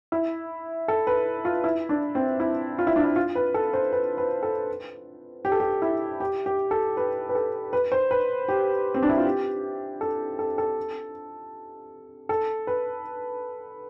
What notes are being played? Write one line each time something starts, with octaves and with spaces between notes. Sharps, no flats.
E4
A4
B4
F4
E4
D4
C4
E4
F4
E4
D4
E4
F4
B4
A4
C5
B4
B4
A4
G4
A4
G4
E4
G4
G4
A4
B4
B4
A4
B4
C5
B4
G4
C4
D4
E4
F4
G4
A4
A4
A4
A4
B4